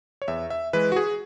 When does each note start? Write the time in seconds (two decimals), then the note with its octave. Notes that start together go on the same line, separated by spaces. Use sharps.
0.22 C#5
0.28 E2 E5
0.50 E5
0.73 E3 G#3 B4
0.92 F#4
0.96 G#4